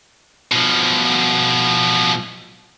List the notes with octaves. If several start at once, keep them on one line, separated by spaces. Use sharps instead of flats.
B2 F3